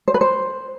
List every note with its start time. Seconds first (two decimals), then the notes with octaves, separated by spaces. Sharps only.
0.08 C5
0.14 B4
0.21 C5